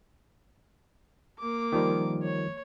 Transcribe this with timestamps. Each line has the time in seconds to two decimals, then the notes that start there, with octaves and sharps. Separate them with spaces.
1.39 A#3 D6
1.72 D#3 F3 G3
2.22 C#5